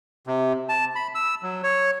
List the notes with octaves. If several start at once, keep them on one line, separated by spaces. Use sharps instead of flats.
C3
A5
B5
E6
F#3
C#5